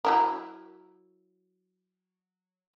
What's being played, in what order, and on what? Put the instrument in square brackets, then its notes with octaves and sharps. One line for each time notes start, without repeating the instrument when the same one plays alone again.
[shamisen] F#3 E4 A#4